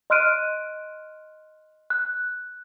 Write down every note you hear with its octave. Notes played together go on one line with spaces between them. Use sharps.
D#5 C6 F6 F#6 D7 D#7
F#6